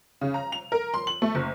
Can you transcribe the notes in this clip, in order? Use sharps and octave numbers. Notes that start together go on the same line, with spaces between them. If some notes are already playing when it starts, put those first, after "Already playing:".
C#3
A#5
F7
A#4
C6
F#7
A3
F#1